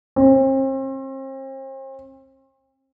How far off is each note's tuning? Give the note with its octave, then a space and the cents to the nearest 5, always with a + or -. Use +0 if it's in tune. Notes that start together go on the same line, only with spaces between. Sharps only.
C4 +40